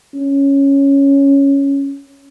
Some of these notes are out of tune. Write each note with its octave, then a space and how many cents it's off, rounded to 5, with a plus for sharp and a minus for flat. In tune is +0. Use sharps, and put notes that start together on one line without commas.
C#4 +0